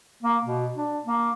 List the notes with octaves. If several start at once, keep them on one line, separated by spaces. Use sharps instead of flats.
A#3
B2
D4
A#3